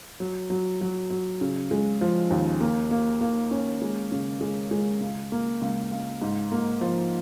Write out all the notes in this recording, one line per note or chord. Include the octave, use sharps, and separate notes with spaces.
F#3
F#3
F#3
F#3
C#3
G#3
F3
D#2
A#3
A#3
A#3
C#4
G#3
C#3
G#3
G#3
C#2
A#3
C#2
C#2
G#2
A#3
F3